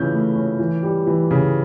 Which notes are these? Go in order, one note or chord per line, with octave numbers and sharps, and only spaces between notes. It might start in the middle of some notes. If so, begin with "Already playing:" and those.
Already playing: C#3 E3 C#4 G6
A3
C#4
E3
G3
E3
C#3